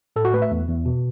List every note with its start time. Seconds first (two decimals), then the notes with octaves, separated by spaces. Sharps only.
0.16 A2 A4
0.25 F#4
0.33 A3 B4
0.42 E5
0.51 E2
0.68 E2
0.86 B2